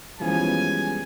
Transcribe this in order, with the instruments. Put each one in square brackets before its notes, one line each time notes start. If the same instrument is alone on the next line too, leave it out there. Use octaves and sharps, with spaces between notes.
[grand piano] E3 F3 C#4 [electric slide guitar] G3 G#3 B3 [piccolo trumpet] G#5